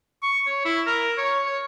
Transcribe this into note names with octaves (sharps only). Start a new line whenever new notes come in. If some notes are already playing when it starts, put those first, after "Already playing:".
C#6
C#5
E4
A#4
C#5
C#5